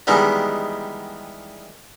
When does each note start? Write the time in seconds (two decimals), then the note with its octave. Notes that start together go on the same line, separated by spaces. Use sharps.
0.07 D#3 E3 G3 G#3 B3 D#4